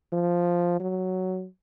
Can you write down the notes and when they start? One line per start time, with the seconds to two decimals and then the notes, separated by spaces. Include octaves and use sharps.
0.13 F3
0.80 F#3